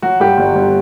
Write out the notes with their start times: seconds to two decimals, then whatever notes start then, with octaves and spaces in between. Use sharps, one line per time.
0.02 F#3 F#4
0.20 G2 G4
0.38 G1
0.55 G1